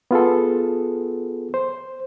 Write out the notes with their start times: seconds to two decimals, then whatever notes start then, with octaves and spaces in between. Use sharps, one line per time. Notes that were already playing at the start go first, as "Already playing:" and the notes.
0.11 B3 F4 G#4 A4
1.54 C5